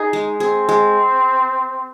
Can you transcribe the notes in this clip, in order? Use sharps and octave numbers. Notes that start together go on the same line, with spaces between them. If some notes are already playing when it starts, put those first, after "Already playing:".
Already playing: D#4 G#4
G#3
C4 G#4
G#3